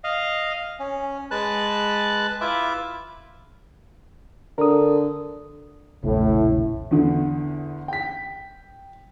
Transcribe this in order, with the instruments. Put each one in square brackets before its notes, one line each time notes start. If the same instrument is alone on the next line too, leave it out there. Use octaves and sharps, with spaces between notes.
[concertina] D#5 F5
C#4
G#3 B4 A5 F#6
E4 F4 B4 E5 D6
[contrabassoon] D3 [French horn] A4 [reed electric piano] A#4 D#6
[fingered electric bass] E1 A#1 C#3 [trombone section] A2
[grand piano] E2 D3
G5 B6